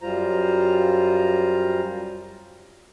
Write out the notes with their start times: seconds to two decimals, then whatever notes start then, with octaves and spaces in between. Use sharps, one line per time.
0.02 F#2 G3 F4 C5 A#5